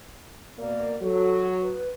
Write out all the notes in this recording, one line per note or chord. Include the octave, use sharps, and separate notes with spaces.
B2 A#3 D5
F#3 A4
B4